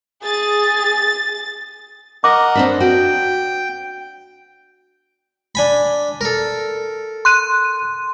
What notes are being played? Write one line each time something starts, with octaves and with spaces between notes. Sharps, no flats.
G#4 A6
A#4 D#5 F#5 D6
C4 D4 B4
F#4 G5
D4 G#5 B5
A4 A#4
C6 F#6 D#7